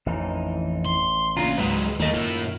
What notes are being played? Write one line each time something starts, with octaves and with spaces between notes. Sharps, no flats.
A1 F2 E3 D#4
C6
A#1 C#3 D4 F4 A#5
C#2 G#2 F#3 G#3 B4
D#2 D#3 A3 A#3 D#5
F#2 A2 D#3 E4 F4